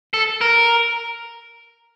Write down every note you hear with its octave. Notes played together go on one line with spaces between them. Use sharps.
A4
A#4